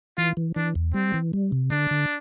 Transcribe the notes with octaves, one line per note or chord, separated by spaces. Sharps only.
E3 F4
E3
E3 D4
E2
G3 C4
E3
G3
C3
D3 D4
D3